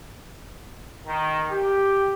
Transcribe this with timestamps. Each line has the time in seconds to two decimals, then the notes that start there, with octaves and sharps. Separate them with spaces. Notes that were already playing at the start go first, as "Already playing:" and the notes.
1.07 D#3
1.51 G4